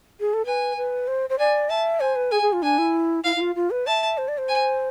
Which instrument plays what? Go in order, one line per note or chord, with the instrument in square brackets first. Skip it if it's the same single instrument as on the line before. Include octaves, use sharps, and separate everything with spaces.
[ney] G#4
A4
[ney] B4 [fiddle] G#5
[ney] B4
C5
C5
[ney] D5 [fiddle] G#5
[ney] E5 [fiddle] A5
[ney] C5 [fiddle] G#5
[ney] B4
[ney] G#4 [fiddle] G#5
[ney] G#4
F4
[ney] D4 [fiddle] G#5
[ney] E4
[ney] E4 [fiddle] F5
[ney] E4
F4
F4
B4
[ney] E5 [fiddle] A5
[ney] C5
D5
C5
[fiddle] G#5